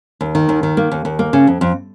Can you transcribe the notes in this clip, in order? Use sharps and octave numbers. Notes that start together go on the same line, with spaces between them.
D#2
D#3
D#2
D#3
A#3
D#2
D#2
A#3
C#3
F2
F2